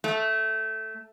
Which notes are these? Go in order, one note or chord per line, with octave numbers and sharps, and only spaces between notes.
A3